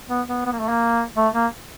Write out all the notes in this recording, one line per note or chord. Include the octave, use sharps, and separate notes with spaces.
B3
B3
B3
A#3
A3
A#3
A3
A#3